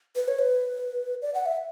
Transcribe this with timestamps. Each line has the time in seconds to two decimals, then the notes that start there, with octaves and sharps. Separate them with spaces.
0.16 B4
0.28 C#5
0.39 B4
1.22 D5
1.34 F#5
1.46 E5